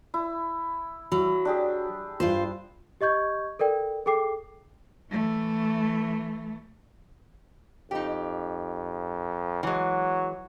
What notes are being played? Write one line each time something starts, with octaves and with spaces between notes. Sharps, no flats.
E4
F#3 E4
D4 G4 G#4
G2 F4 C5
G4 D#5 C#6 G6 G#6
A4 A#4 D5 G5
G#4 A4 G5 D6 C7
E3 A3
F2 D#4 G4
E3 F#3 G#3